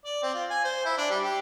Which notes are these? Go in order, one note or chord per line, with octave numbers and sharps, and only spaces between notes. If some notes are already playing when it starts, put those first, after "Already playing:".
D5
C4
F4
G#5
C5
E4
D4
G3
G4